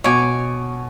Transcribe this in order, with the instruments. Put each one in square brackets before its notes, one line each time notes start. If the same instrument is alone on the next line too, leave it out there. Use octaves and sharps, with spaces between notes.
[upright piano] B2 [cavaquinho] C#5 G#5 D6